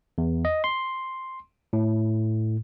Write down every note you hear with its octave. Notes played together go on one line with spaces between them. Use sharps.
E2
D#5
C6
A2